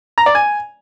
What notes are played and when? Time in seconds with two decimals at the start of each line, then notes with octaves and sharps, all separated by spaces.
0.18 A#5
0.26 D5
0.35 G#5